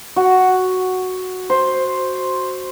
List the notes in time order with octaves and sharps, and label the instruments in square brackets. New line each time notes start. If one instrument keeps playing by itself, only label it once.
[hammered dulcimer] F#4
C5